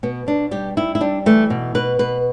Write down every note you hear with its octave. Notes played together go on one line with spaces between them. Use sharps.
B2 B3
B2 D4
G3 G4
G3 E4
E4
G3 D4
E3 A3
B2
B2 B4
B2 B4